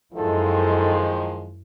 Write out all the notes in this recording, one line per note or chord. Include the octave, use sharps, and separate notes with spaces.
F#2 D#3 F3 G#3 E4 A4